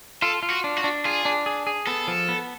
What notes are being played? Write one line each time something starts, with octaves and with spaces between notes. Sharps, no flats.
F4 A4
F4
F#4
D4
F#4
D4
F4 G#4
D4
G#4
G#4
B3 A4
F3
B3